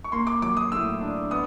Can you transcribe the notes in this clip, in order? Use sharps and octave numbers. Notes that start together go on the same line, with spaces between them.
C#6
A#3 C6
D6
F#3 D6
D#6
A2 E6
D4
B3 D#6